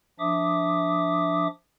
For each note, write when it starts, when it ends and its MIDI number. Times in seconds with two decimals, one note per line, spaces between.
0.19 1.47 53
0.19 1.47 62
0.19 1.47 76
0.19 1.47 86
0.19 1.47 87